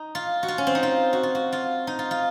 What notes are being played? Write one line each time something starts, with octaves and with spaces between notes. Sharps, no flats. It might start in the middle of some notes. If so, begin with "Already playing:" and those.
Already playing: D#4
F4
F#4
F4
C#4
C4
D#4
F4
F#4
F4
F#4
F4
D#4
F4
F4